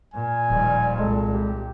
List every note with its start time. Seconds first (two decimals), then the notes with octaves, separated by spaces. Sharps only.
0.14 A#2 G#5
0.50 D1 D#3 F3 G3
0.99 C2 G#3 A4
1.33 G4